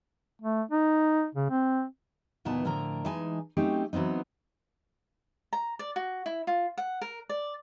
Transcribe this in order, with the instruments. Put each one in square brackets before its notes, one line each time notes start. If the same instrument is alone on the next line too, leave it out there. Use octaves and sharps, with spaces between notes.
[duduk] A3
D#4
C#3
C4
[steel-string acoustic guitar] D2 A#2 E3 B3 D#4 A5
A2 D3 F3 A#4 A#5
E3 G#3 D#4 G#5 A5
F#3 A3 C4 C#4 D#4 G4
E3 F#3 B3 C4 D#4
[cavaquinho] A#5
D5
F#4
E4
F4
F#5
A#4
D5